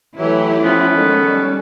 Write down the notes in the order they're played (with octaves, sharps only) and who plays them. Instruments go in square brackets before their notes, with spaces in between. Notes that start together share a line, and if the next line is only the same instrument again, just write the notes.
[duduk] E3 [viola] F#3 A3 [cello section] E4 G4
[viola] F3 [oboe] B3 [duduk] C#4
[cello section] D#3 G#3 [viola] A4
[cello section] G3